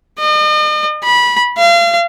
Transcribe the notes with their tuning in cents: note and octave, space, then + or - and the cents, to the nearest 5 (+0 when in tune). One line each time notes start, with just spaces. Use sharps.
D#5 -45
B5 -20
F5 -35